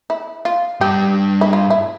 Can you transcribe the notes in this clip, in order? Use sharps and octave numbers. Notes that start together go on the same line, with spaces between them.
E4
F4
G2 G4
E4
F4
E4